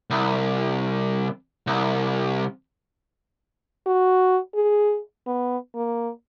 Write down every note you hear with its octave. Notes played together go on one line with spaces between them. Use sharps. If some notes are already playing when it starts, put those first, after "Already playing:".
C2
C2
F#4
G#4
B3
A#3